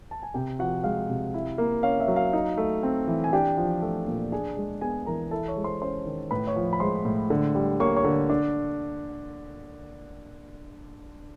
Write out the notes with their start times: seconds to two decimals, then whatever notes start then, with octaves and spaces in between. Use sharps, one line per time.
0.11 A5
0.23 G#5
0.34 C3 G4 G5
0.59 F3 F#4 F#5
0.84 G#3 F5
1.10 C3
1.34 E4
1.58 A#3
1.83 C#4 F5
2.00 E5
2.08 F#3
2.16 F5
2.33 D#4
2.58 A3
2.83 C4
3.08 E3
3.24 G#5
3.33 D4 G4 G5
3.57 F3
3.82 A3
4.08 A#2
4.32 D4 G#4 G#5
4.57 G#3
4.81 B3 G#4 G#5
5.06 E3 A#4 A#5
5.31 E4 A4 A5
5.48 C#5 C#6
5.56 G#3
5.64 C5 C6
5.82 C#4 C5 C6
6.06 D#3
6.31 A2 B4 B5
6.47 C#5 C#6
6.56 F3
6.73 B5
6.80 G#3 C5 C6
7.05 A2
7.30 D3
7.55 G3
7.80 A#3 C#5 C#6
7.96 C#5 C#6
8.04 D3
8.30 D4